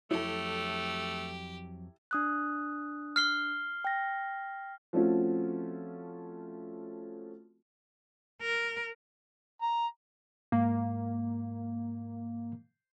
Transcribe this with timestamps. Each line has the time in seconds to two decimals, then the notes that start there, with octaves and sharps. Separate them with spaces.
0.11 F2 F#3 A3 E4 G4 A4 C#5
2.11 D4 D#6 F#6
3.16 F6 C7 G7
3.84 G5 A#6
4.93 F3 A3 C4 C#4 F4 F#4
8.42 A#4
9.62 A#5
10.52 G#2 A#3